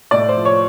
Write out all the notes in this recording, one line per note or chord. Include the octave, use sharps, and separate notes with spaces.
A2 D5
C5
F3
C#5